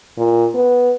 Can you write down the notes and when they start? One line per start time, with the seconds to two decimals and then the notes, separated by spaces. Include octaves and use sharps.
0.18 A#2
0.54 B3